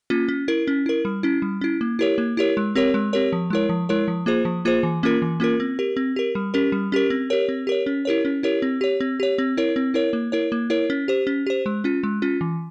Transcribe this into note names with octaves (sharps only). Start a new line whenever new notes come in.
A#3 C#4 F4
C#4
E4 A#4
C#4
E4 A#4
G3
C#4 E4
G3
C#4 E4
A#3
E4 G4 A#4 C#5
A#3
E4 G4 A#4 C#5
G#3
C4 G4 A#4 C#5
G#3
C4 G4 A#4 C#5
F3
G#3 E4 A#4 C#5
F3
G#3 E4 A#4 C#5
F3
A#3 F4 G#4 C5
F3
A#3 F4 G#4 C5
E3
A#3 C#4 F4 A#4
E3
A#3 C#4 F4 A#4
C4
G4 A#4
C4
G4 A#4
G3
C#4 G4 A#4
G3
C#4 G4 A#4
C4
G4 A#4 C#5
C4
G4 A#4 C#5
C#4
E4 G4 A#4 C#5
C#4
E4 G4 A#4 C#5
C4
G4 C#5
C4
G4 C#5
C4
E4 A#4 C#5
C4
E4 A#4 C#5
A#3
E4 A#4 C#5
A#3
E4 A#4 C#5
C#4
G4 C5
C#4
G4 C5
G#3
C#4 F4
G#3
C#4 F4
E3